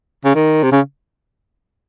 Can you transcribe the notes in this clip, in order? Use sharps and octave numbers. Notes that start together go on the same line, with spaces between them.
C#3
D#3
C3
C#3